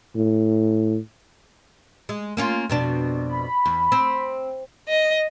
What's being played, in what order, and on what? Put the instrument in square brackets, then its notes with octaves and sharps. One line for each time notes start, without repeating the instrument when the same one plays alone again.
[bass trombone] A2
[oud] G#3
A#3 C#4 F4
F2 B2 D4
[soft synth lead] B5
[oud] E2
C4
[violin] D#5